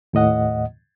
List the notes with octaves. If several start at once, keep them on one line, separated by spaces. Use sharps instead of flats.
D#2 A2 D#5 F#5